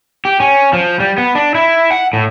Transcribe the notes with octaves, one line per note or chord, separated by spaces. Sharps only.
G4
C#4
F3
G3
B3
D4
E4
F#5
A2